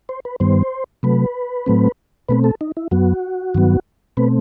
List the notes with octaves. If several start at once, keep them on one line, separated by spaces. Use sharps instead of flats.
C5
B4
G2 D#3 G3 B3 C5
C3 F#3 A3 B4
A2 F#3 A3 C4
B2 A3 C4 B4
A4
D#4
E4
F#2 F#3 B3 F#4
G2 D#3 F#3 B3
B2 A3 C4 B4